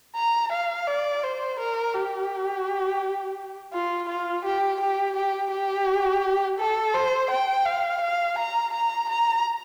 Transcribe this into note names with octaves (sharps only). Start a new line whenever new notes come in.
A#5
F5
D5
C5
A#4
G4
F4
F4
G4
G4
G4
G4
A4
C5
G5
F5
F5
A#5
A#5
A#5